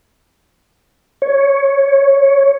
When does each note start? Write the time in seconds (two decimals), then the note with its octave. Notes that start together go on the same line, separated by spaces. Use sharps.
1.22 C#5